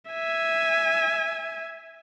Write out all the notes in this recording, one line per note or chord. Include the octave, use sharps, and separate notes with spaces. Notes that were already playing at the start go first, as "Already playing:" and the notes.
E5 G#5